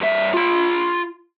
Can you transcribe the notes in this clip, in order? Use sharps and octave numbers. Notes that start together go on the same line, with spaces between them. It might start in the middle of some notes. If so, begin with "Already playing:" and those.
G2 E5
F4 B5